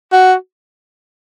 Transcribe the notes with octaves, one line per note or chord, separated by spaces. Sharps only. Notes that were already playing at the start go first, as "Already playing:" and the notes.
F#4